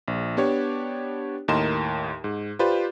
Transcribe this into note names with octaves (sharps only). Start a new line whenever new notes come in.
A#1
B3 D4 G4 C#5
D#2 A2 A#4 D#5 C6 E7
G#2
F4 G4 B4 C5 D5